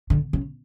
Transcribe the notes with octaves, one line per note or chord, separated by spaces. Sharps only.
D3
C#3